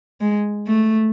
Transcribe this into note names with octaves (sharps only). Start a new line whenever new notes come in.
G#3
A3